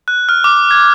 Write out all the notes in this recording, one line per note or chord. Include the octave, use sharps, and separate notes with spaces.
F#6
F6
D6
G#6